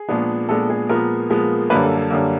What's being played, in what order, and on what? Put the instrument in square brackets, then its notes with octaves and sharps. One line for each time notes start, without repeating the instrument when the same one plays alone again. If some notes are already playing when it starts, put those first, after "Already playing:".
Already playing: [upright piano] G#4
A#2 F3 G#3 B3 D4
A#2 F3 G#3 B3 D4 A4
G#4
A#2 F3 G#3 B3 A#4
A#2 F3 G#3 B3
F#2 D3 G3 A#3 B4
A4
A4
F#2 D3 G3 A#3